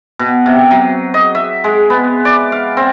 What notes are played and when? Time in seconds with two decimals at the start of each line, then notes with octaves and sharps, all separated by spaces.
0.19 B2
0.46 C3
0.71 F#3
1.14 D#5
1.35 E5
1.64 G#3
1.90 B3
2.25 D5
2.52 F5
2.77 C4